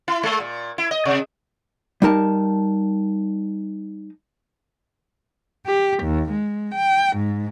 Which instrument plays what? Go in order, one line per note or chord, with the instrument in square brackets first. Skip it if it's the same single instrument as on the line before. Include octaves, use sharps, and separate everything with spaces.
[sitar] E4
G#3
A#2
E4
D#5
C3
[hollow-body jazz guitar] G3 D#4 A#4 A5
[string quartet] G4
D#2
G#3
G5
G#2